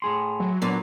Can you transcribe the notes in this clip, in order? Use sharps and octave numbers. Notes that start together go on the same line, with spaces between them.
A2 G#4 C6
F#3
A#2 F#3 B3 D4